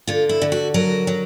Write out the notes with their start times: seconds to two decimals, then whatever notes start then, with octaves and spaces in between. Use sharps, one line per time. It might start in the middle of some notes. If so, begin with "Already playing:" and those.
0.07 D3 F4
0.29 E4
0.42 D3
0.52 F#4
0.74 F#3 A#4
1.07 F#3